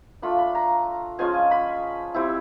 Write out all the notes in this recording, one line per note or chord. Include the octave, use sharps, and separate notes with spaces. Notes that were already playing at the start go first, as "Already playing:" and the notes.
A3 D4 F4 B5
B5
A#5
F3 G#3 C#4 F4 G#5
G#5
B5
G3 C4 E4